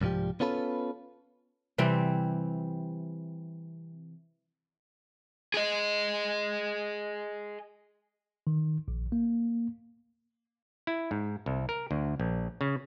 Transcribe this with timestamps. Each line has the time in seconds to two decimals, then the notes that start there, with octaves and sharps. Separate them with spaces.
0.01 C2 G#2 F3 G3 G4
0.40 B3 C#4 F4 A4 B4
1.78 C3 E3 G3 C4
5.54 G#4 D#5
8.47 D#3
8.88 A#1
9.12 A#3
10.87 E4
11.11 G#2
11.46 C2
11.69 A#4
11.91 D2
12.20 A#1
12.61 C#3